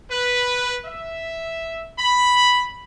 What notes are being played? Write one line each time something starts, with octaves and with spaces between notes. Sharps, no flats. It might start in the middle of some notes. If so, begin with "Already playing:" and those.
B4
E5
B5